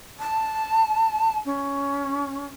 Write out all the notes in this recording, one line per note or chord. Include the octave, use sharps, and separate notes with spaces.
A5
C#4